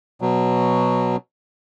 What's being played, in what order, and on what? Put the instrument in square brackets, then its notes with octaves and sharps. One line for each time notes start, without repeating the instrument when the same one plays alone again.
[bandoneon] B2 F#3